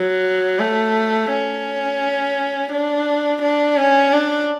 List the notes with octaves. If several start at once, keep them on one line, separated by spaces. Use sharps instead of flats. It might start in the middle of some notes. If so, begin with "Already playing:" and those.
Already playing: F#3
A3
C#4
D4
D4
C#4
D4